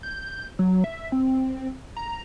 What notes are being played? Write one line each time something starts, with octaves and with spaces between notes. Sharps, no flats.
G6
F#3
E5
C4
A#5